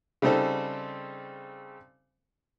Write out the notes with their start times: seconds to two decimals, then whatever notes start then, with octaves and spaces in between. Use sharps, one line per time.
0.22 C#3 G3 C4 D#4 A4 C5